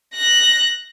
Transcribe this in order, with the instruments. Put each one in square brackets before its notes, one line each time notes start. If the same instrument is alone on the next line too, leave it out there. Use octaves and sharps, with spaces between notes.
[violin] F#6 A#6